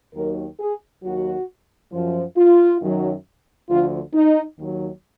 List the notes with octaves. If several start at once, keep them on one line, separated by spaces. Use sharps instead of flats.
D#2 D#3 F#3 A#4
G#4
D#2 D#3 F#3 F#4
F#2 F3
F4
F#2 D#3 F#3
D2 D3 F3 F4
D#4
D#2 D#3 F#3